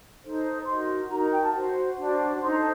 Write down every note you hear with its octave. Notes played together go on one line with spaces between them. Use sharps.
D#4 A4 C5
D#4 F#4 A#4 C6
D#4 F#4 A#4 A#5
A#5
G5
A5
F#4 C5
D4 F#4 C5
D#4 A4 C5 C6
A#5
A5